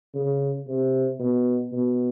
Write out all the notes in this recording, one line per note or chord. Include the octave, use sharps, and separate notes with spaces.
C#3
C3
B2
B2